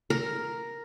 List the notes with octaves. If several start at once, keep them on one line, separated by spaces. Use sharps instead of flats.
A#4